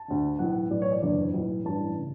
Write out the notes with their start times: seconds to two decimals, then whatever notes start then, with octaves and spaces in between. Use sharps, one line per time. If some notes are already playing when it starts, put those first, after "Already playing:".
Already playing: A5
0.08 D2 D3
0.39 B1 A2 E3 F#5
0.71 B1 A2 E3 D5
0.82 C#5
0.92 D5
1.02 F#1 E2 D3 D5
1.34 B1 A2 E3
1.65 A1 G2 E3 A5
1.99 C#3